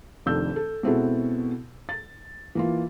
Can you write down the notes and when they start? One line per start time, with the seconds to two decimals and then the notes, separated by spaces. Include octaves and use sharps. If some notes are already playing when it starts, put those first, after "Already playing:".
0.26 F1 F2 D#3 D4 E6 G6
0.56 A4
0.83 B2 G#3 C4 E4 F#4 A4
1.89 A6
2.55 E3 A#3 F4